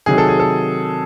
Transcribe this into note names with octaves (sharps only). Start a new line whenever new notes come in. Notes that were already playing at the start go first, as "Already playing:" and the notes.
C3 D#3 F#3 G#4
A4
G#4
A4